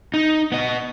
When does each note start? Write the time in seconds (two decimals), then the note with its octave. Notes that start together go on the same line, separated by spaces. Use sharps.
0.14 D#4
0.52 B3 D#5